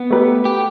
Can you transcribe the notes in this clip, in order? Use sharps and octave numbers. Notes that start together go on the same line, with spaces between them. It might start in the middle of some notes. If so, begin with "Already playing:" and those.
Already playing: B3
A3 G4 B4
G4